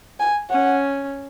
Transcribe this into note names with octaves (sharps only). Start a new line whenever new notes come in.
G#5
C#4 F#5